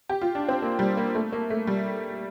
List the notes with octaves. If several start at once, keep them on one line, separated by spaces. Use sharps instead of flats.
G4
F4
D4
C4
A#3
G3
A#3
A3
A#3
A3
G3